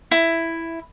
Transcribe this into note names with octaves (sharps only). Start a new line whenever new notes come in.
E4